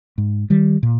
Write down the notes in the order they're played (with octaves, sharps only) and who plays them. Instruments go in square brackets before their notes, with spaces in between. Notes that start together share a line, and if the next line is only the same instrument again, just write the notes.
[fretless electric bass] G#2
D#3 G3
A#2